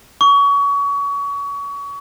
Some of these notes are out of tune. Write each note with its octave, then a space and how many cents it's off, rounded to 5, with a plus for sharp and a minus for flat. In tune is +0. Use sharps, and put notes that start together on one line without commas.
C#6 +30